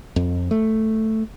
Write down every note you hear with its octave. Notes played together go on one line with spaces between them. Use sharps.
F2
A3